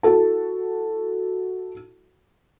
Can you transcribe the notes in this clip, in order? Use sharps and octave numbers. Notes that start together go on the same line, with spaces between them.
E4 F#4 A4 A5